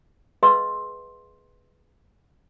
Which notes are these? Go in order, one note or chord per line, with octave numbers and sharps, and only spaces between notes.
G#4 B4 D#5 F5 C6 E6